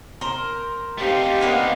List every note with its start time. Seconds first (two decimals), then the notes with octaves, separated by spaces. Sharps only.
0.21 A#4 C5
0.98 A3 C4 D#4 G4 F5
1.41 A#3 B3 D4